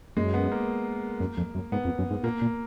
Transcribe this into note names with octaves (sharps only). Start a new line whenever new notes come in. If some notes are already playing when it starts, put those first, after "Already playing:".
F#2 G#3
B3
A#3
F#2
F2
F#2
G#2 B3
F2
F#2
G#2
A#2 A#3
A#2